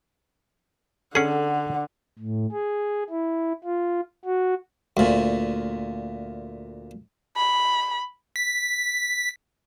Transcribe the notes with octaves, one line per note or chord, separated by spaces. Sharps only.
D3 C#4 G#4 A4 F#5
A2
G#4
E4
F4
F#4
D2 A#2
B5
B6